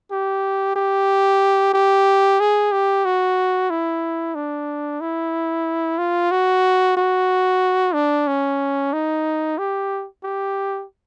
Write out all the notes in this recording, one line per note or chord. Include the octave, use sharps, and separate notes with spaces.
G4
G4
G4
G#4
G4
F#4
E4
D4
E4
F4
F#4
F#4
D4
C#4
D#4
G4
G4